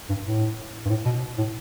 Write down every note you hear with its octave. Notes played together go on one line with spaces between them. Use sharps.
G2
A2
G2
A2
B2
A2